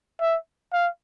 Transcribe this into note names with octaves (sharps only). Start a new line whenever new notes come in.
E5
F5